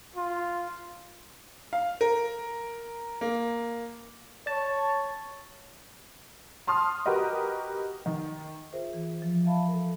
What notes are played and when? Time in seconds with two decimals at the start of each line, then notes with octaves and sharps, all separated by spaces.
0.16 F4
1.73 F5
2.01 A#4
3.21 A#3
4.47 C#5 A5
6.67 A5 C6 D#6 F6
7.06 F#4 G4 A#4 B4 D#5
8.06 D#3
8.73 F4 G#4 A#4 C5 E5
8.93 E3
9.22 F3
9.45 E5 F5 A5 B5
9.68 A4 A#4